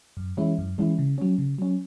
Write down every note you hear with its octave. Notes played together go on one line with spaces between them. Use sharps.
F#2
E3 G#3 C#4 E4
F#2
E3 G#3 C#4 E4
C#3
F#3 C#4
C#3
F#3 C#4